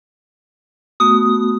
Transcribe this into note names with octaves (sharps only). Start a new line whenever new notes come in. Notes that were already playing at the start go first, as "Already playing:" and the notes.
A3 B3 F#4 D#6